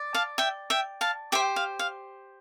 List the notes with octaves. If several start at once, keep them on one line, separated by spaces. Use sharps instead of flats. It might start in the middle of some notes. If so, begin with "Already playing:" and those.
Already playing: D5
F5 A5
E5 G5
E5 G5
F5 A5
G4 C5 E5 G5
F5
F5